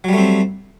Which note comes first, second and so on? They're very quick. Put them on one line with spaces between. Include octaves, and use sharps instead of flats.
F#3 G3 A3 C4